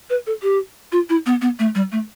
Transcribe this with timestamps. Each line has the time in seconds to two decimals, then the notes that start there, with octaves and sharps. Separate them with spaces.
0.10 B4
0.27 A4
0.43 G4
0.92 F4
1.10 E4
1.26 B3
1.42 B3
1.59 A3
1.75 G3
1.92 A3